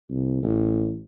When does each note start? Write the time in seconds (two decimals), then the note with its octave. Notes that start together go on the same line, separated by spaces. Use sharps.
0.10 C2
0.43 A1